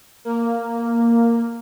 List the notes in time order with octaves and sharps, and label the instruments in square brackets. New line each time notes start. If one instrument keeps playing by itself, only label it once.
[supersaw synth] A#3